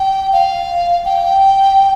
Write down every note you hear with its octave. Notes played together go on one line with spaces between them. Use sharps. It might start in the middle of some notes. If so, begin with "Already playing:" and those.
Already playing: G5
F5
G5